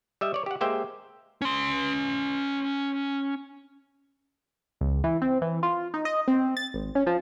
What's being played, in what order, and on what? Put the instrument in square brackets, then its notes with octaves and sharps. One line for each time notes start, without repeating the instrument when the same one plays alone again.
[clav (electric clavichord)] G3 D#5 E5
C#5 D5
G4 F#5
G#3 A#3 G4 C5 E5 G5
[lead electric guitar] C#4 C6
[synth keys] C#2
E3
C4
E3
F4
D#4
D#5
C4
A6
G#1
C#4
F3